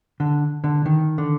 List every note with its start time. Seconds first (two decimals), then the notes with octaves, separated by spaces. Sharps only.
0.20 D3
0.64 D3
0.86 D#3
1.18 D3